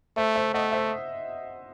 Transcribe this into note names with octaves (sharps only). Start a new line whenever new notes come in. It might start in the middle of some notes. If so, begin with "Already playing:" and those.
A3 C5 E5
C5 E5
A3 D#5 F#5
C5 E5